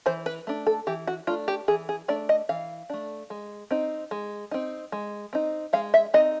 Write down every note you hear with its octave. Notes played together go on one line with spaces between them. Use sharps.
E3 C5
B4
A3 D4
A4
E3 G4
F#4
A3 D4 F4
G4
E3 G#4
G#4
A3 D4 D5
D#5
E3 F5
A3 D4
G#3
C4 D#4
G#3
C4 D#4
G#3
C4 D#4
G#3 F5
E5
C4 D#4 D#5